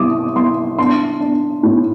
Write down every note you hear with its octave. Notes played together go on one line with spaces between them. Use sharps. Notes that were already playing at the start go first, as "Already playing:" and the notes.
Already playing: C2 G3 D6 D#6
C2 C6
D4 C6
D4
A2